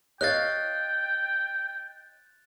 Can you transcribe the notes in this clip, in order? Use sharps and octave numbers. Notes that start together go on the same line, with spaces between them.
C#5 D#5 F5 G5 F#6 A6